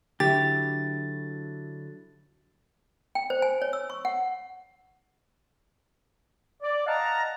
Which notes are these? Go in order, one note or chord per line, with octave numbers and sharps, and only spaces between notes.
D3 F#3 E4 G4 A6
G5
C5
G#5
C#5
E6
C#6
F#5
D5
D#5 F5 F#5 A5 A#5